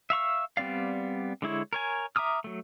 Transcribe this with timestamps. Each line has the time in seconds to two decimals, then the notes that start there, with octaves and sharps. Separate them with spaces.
0.10 E5 F5 C#6 E6
0.57 G3 B3 C4 D5 F5
1.42 D3 G#3 E4 C#5
1.73 A#4 C#5 G#5
2.16 E5 A#5 D6 D#6 F6
2.44 F#3 A3